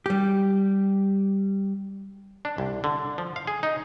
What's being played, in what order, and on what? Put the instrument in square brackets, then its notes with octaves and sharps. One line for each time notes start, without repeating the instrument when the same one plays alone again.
[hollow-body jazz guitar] G3 G4
[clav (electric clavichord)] D4
C2
D3
F3
F5
G#4
D#4